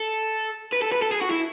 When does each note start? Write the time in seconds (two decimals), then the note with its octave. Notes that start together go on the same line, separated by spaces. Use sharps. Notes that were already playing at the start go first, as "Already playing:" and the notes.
Already playing: A4
0.73 B4
0.82 A4
0.92 B4
1.02 A4
1.12 G#4
1.21 F#4
1.30 E4